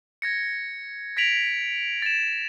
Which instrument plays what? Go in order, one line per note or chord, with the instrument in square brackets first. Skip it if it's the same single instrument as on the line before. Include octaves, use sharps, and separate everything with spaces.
[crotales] G#6 A#6 C#7
G#6 A#6 B6 D7 F7 F#7
A6 E7